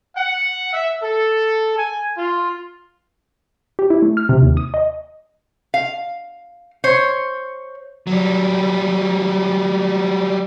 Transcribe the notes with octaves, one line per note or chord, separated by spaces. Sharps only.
F#5
E5
A4
G#5
F4
G4
E4
A3
F6
C3
D#2
D#6
D#5
F5
C5 C#5
F#3 G3